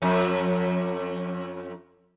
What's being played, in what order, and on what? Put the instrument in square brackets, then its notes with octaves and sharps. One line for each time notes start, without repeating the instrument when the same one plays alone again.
[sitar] F2 C#4